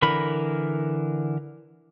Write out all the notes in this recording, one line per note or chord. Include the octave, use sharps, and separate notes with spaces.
D3 E3 A#4 B5